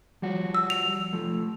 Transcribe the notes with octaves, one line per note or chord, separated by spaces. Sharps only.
F3 G3 F#4
E6
F7
F3 A3